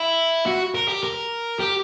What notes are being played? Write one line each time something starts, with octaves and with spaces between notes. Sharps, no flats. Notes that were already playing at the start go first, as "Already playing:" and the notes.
Already playing: E4
F#4
A#4
G4
A#4
G4